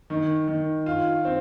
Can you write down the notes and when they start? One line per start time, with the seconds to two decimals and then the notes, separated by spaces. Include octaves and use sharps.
0.10 D#3
0.48 D#3
0.86 F4
1.25 C4